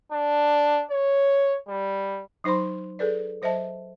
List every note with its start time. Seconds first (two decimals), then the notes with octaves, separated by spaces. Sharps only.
0.12 D4
0.91 C#5
1.68 G3
2.44 F#3 D#4 C5 B5 C6
2.99 G#4 A4 B4 D5
3.42 F#3 C5 D#5 E5 A5